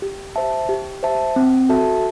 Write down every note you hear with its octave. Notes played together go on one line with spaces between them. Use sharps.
G4
C5 E5 A5
G4
C5 E5 A5
C4
F#4 A4 E5 A5